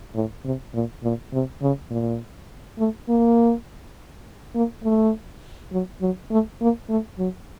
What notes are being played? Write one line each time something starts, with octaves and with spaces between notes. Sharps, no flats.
A2
C3
A#2
A#2
C3
C#3
A#2
A3
A#3
A#3
A3
F#3
F#3
A3
A#3
A3
F#3